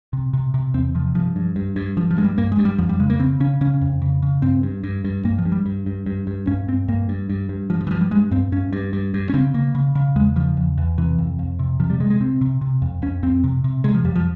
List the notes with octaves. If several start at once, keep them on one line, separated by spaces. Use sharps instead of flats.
C3
C3
C3
E2 C4
C3 F3
G2 F3
G2
G2
G2
G2 F3
F3
G2 G#3
G3
G2 A#3
G#3
G2
G3
F2 F3
G3
C#3 G#3
A#3
C#3 C4
C#3 C#4
C#3 C#4
F2
C#3
C#3
G2 C4
G2
G2
G2
G2 A#3
F3
G2
G3
G2
G2
G2
G2
G2 C#4
G2 C4
G2 A#3
G2
G2
G2
G2 F3
F3
E3
G2 F3
G3
G2 G#3
G2 C4
G2 C#4
G2
G2
G2
C#4
C#3 C4
C#3 A#3
C#3
C#3
E2 G#3
C#3 F3
E2
E2
C3 E3
F2
F2
C3
C3 F3
G3
C3 G#3
G#3
C3 C4
C3
C3
F2
F2 C#4
F2 C4
C3
C3
C3 G#3
F3
F2 G3
F3